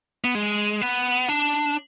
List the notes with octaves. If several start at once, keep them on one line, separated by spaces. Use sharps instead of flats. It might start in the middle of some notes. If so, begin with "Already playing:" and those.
B3
G#3
B3
D4